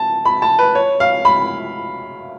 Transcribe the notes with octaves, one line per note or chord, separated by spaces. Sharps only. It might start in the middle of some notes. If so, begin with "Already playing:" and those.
Already playing: A5
B5
A5
B4
C#5
F5
B5